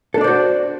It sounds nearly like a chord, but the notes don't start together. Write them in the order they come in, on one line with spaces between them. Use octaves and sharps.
A4 D4 D5 C5 F#4